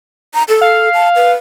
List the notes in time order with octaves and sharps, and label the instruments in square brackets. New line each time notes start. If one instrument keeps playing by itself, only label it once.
[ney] A#5
A4
[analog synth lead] F5
[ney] A5
B4